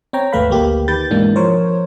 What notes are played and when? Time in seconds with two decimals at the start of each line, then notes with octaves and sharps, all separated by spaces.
0.13 C4 C#5 G5 A#5
0.32 G#1 D#2 A3 B4 F5 B5
0.50 D2 A3 A#3 G4
0.88 D#3 G4 B4 G6 A6
1.11 G#2 B2 E3 G#3 A#3 D4
1.36 F3 A#4 C5 C#5